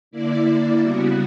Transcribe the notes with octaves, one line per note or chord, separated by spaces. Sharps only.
D3 A#3 E4 D5
C#3 G3 B3 F#4